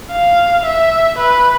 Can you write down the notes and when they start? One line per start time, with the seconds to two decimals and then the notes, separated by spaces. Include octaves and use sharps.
0.12 F5
0.65 E5
1.19 B4